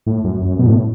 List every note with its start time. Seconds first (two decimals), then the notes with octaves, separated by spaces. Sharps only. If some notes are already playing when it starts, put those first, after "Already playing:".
0.06 A2
0.24 F#2
0.42 F#2
0.59 B2
0.67 A2